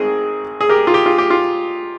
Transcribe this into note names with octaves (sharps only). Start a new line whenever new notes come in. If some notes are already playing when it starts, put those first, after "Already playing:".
Already playing: G#1 G#2 D#3 G#3 C4 G#4
G#4
G4 A#4
F4
G4
F4
G4
F4